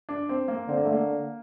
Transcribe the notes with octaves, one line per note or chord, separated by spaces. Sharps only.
D4
C4
A#3
D3 C4
A#3
A3
A#3